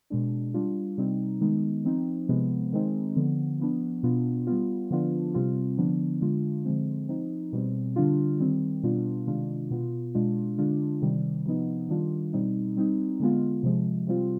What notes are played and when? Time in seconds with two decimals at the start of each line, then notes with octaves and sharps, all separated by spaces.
0.10 B2 G#3 D4
0.54 G3 D4 F4
0.98 C3 G3 C4 D#4
1.41 D#3 G#3 B3 D#4
1.84 F3 C4 D#4
2.28 C3 F3 G#3 B3
2.72 D#3 G#3 C4 D#4
3.16 D3 F3 B3
3.59 F3 B3 D4
4.03 B2 B3 D4 F4
4.47 G3 B3 F4
4.91 D3 F3 B3 D4 F4
5.34 C3 G3 C4 F4
5.78 D3 F3 B3 D4
6.21 D3 G#3 D4 F4
6.65 D3 F3 G#3 C4
7.09 F3 C4 D#4
7.53 B2 G3 C4
7.96 D3 G3 D4 F4
8.40 D#3 G3 C4
8.83 B2 G3 B3 D4 F4
9.27 C3 D#3 G#3 D4 F4
9.71 B2 B3 F4
10.15 B2 G#3 D4 F4
10.58 D3 G#3 D4 F4
11.02 C3 D#3 G3
11.46 C3 F3 B3 D#4
11.89 D#3 G3 D4 F4
12.33 B2 G3 C4 D#4
12.77 G3 C4 D#4
13.20 D3 G#3 B3 F4
13.63 C3 F3 G#3
14.07 C3 G3 C4 F4